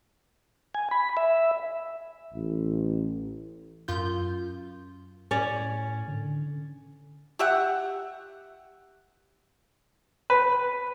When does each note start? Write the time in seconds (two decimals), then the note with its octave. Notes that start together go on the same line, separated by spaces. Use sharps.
0.75 G#5
0.91 B5
1.17 E5
2.33 A1
3.88 F#2 F4 G6
5.31 A2 C#4 C#5 D5
6.08 D3
7.39 G4 E5 F#5
10.30 B4